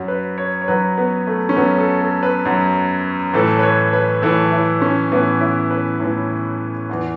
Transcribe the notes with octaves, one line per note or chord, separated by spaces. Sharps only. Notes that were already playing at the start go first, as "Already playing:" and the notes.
Already playing: F#2 F#3
B4
C#5
C#5
F#2 F#3 B4
B3
A3
C#4
F#2 F#3 B3
A4
A4
B4
F#2 F#3
A2 E3 A4
B4
C#5
B4
A2 E3 A4
E4
C#4
A2 E3 B3
E4
B4
A2 E3
E2 E3